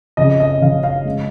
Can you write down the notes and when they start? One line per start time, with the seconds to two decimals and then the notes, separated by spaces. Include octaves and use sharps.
0.17 F#1 F2 C#3 D#5
0.40 D#5
0.61 F#1 F2 C#3 F5
0.83 F5
1.05 C#3 G#3